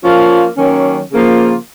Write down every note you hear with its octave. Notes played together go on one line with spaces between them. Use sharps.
F3 A#3 C#4 F4
D#3 F#3 A#3 C#4
C#3 F3 A#3 F4